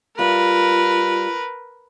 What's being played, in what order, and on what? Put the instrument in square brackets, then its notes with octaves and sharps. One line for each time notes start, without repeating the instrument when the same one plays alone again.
[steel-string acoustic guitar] G3 F4 [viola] A#4 B4